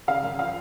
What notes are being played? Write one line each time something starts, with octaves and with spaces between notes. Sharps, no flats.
C#3 F5
F#2
F3 F5